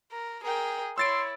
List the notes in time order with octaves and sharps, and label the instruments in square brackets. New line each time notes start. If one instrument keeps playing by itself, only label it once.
[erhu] A#4
[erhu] G#4 [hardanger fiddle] A#4 G5
[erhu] E4 [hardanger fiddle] C#5 [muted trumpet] C6 [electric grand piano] E6 A6 D7